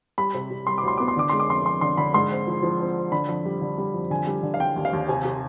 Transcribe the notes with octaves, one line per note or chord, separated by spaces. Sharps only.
G3 B5
C3
C3
G3 C6
D6
D2 C6
B3 D6
C6
D3 D6
G#3 C6
D6
F1 C6
F1 C6
D3 C6
D3 B5
G#2 C6
C4
F3
F3
C4
C4
D3 B5
F2
G3
D3
G3
F2
D3 G#5
G3
D3
F5
D3 G5
D#2
F5
D#2
C3 G#5
C3